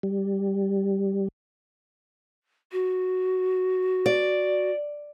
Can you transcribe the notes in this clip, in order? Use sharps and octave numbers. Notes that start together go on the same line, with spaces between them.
G3
F#4
D5